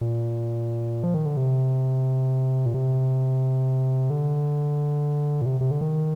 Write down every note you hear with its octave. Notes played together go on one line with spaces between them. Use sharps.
A#2
F3
D#3
D3
C3
A#2
C3
D3
A#2
C3
C3
D3
D#3